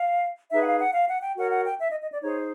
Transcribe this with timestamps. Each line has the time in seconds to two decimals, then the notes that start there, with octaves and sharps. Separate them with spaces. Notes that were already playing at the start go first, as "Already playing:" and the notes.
Already playing: F5
0.51 D#4 G#4 B4 E5
0.61 F#5
0.66 F5
0.80 F#5
0.94 F5
1.08 F#5
1.22 G5
1.37 F#4 A#4 C#5 F#5
1.51 F#5
1.65 G5
1.80 E5
1.90 D#5
2.00 D#5
2.11 D5
2.22 D#4 G#4 C5 C#5